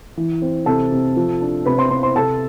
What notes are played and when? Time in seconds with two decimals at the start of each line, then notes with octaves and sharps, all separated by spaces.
0.17 E3
0.42 C4
0.66 C3 A4 A5
0.92 C3
1.16 F3
1.41 D4
1.66 C3 B4 B5
1.78 C5 C6
1.91 C3 C5 C6
2.03 C5 C6
2.16 C3 A4 A5